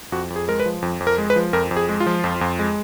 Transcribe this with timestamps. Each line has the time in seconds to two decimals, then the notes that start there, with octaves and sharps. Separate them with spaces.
0.12 F2 F#4
0.30 F2
0.36 G#4
0.48 G#3 A#4
0.60 B4
0.65 F3
0.82 F2
1.00 F2
1.07 A#4
1.18 G#3
1.30 B4
1.36 F3
1.53 F2 A#4
1.71 F2
1.77 G#4
1.89 G#3
2.00 F4
2.06 F3
2.24 F2
2.41 F2
2.59 G#3